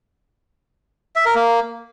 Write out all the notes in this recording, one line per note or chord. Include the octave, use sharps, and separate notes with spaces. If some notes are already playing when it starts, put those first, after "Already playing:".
E5
A#4
A#3